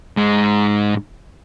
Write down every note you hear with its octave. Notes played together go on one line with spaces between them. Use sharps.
G#2 G#3